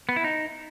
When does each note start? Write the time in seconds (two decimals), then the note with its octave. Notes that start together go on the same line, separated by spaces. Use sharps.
0.09 B3
0.16 E4
0.24 D#4